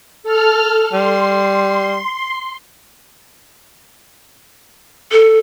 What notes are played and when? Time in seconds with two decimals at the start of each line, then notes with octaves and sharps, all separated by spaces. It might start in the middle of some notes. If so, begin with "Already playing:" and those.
0.23 A4 F6
0.93 G3 C6
5.12 A4